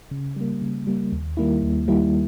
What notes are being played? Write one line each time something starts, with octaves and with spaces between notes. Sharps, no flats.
C#3
G3 A#3
C#3
G3 A#3
D#2
D#3 G3 A#3 E4
D#2
D#3 G3 A#3 E4